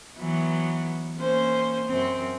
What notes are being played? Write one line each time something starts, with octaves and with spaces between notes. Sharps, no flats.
E3 F#3 B3
A#3 C#4 C5
F#2 C4